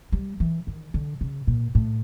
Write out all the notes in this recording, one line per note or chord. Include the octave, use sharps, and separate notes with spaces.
G3
E3
D#3
D3
C#3
A#2
A2